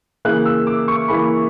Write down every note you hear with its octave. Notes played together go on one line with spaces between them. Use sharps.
C#3 E3 A#3 F#6
E6
D6
C#6
C#3 E3 A#3 B5